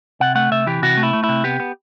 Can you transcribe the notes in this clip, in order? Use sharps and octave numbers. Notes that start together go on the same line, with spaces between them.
C3 F#5
A3 F#5
C3 E5
E3 G4
C3 F#4
A3
E4
A3
E4
C3
B3 G4
B3